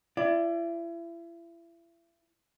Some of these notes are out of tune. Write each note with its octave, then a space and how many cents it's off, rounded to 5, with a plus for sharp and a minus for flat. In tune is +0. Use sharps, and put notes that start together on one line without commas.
E4 +35 D5 +5